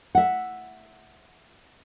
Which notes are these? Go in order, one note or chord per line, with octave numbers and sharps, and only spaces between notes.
E5 F#5